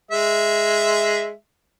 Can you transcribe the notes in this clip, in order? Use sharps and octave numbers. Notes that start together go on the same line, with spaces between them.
G#3 E5